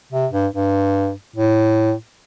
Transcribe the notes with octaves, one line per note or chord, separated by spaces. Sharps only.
C3
G2
G2
A2